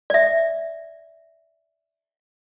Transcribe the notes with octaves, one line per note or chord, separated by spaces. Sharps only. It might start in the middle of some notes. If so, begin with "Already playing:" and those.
D5 E5